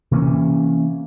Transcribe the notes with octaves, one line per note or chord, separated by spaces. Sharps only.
C3 E3 A#3 C#4